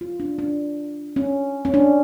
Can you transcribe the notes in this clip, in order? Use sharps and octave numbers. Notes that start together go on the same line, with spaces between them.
F4
D4
D4
C#4
C#4
D4